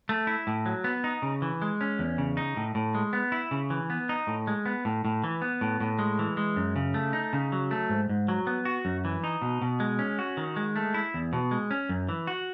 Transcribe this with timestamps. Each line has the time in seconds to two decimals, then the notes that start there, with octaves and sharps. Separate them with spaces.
0.09 A3
0.27 E4
0.47 A2
0.66 F#3
0.84 B3
1.04 D#4
1.22 C#3
1.42 E3
1.62 G#3
1.81 C#4
1.99 E2
2.18 C#3
2.37 D#4
2.57 A2
2.75 A2
2.95 G#3
3.13 B3
3.32 E4
3.51 C#3
3.70 E3
3.90 B3
4.09 D#4
4.27 A2
4.47 G#3
4.66 B3
4.85 A2
5.05 A2
5.24 E3
5.42 B3
5.61 A2
5.80 A2
5.99 G#3
6.19 E3
6.37 G#3
6.56 F#2
6.76 C#3
6.94 A3
7.13 D#4
7.33 C#3
7.52 F#3
7.71 A3
7.90 G#2
8.09 G#2
8.28 F#3
8.47 B3
8.65 F#4
8.85 F#2
9.05 E3
9.24 D#4
9.42 B2
9.62 B2
9.80 G#3
9.99 C#4
10.19 F#4
10.37 D#3
10.56 G#3
10.76 A3
10.94 E4
11.14 E2
11.33 B2
11.51 G#3
11.71 C#4
11.89 F#2
12.09 E3
12.27 F#4